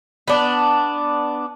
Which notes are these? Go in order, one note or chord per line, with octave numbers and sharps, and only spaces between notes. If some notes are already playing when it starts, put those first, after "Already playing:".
B3 D4